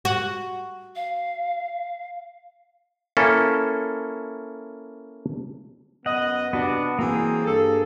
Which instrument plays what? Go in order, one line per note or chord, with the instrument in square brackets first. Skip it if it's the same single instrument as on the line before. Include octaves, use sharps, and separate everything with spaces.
[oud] F#4
[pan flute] F5
[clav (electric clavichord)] A#3 C#4 E4 A4
[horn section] F#2 B3 D#5 [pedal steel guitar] F#5
[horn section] C3 D4 [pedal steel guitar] B3 F#4
[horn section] E3 F#3 C4 [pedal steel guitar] A#3 G#4
[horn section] G2 A4